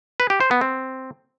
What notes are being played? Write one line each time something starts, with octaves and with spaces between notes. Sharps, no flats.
B4
G4
C5
B3
C4